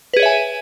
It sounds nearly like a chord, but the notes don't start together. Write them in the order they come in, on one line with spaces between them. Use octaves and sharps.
B4 G#4 C#5 E5 G#5